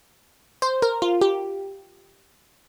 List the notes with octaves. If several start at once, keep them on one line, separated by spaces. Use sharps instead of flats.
C5
A#4
F4
G4